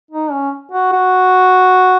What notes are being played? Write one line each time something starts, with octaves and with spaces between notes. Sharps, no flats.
D#4
C#4
F#4
F#4